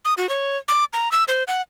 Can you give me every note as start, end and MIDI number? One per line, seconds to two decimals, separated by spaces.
0.05 0.14 87
0.17 0.29 66
0.29 0.57 73
0.68 0.84 86
0.93 1.11 82
1.12 1.24 88
1.28 1.44 72
1.47 1.62 78